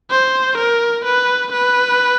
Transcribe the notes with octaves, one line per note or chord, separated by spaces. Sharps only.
C5
A#4
B4
B4